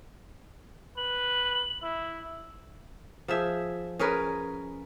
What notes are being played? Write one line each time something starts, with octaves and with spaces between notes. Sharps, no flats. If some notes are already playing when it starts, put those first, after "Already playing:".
B4 F#7
E4
F3 G#4 E5
C#4 G#4 A#4 B4